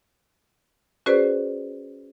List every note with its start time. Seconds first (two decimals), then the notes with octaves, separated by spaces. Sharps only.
1.06 C#4 F#4 G#4 B4 C5 D5